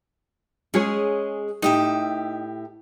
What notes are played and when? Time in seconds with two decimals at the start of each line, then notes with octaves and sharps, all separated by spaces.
0.74 G#3 C#4 G#4 C#5
1.62 A2 D#4 G4 E5